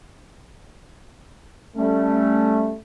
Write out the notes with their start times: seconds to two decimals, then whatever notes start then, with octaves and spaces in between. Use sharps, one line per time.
1.77 G3 A3 C#4